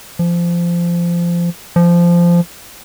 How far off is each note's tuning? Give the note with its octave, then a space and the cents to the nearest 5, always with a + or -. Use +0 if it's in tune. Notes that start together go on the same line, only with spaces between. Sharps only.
F3 -20
F3 -15